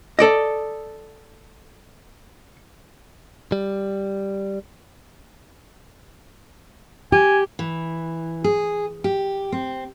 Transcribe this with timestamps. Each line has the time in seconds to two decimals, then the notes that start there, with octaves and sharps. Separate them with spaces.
0.19 A4 D5 D#5
3.52 G3
7.12 G4 G#5
7.59 E3
8.44 G#4
9.04 G4
9.52 C4